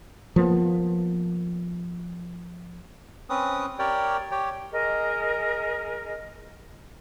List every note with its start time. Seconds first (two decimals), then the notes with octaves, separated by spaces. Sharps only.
0.36 F3 A#3 B3
3.30 C4 C#4 B4 D#6
3.79 G4 A#4 C#5 D5 G5
4.31 G4 C#5 G5
4.72 G#4 A#4 D#5